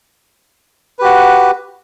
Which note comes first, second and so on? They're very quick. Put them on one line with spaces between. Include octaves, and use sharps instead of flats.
B4 G4 F#4